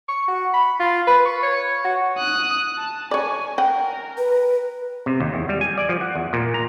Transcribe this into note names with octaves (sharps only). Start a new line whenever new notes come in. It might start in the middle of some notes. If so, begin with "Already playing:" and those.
C#6
F#4
B5
F4
B4
C#6
C#5
F#4
D#6 F#6
A5
C#5 D5 G#5
A#4 F#5 G5
B4
C3
D#2
E2
G3
G#5
D5
F3
F#5
E2
A#2
A#5